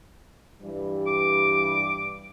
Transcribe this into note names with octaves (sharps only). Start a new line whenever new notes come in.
G2 E3 G3
D6